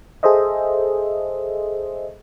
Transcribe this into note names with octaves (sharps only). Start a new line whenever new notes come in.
G#4 A4 C5 D#5 E5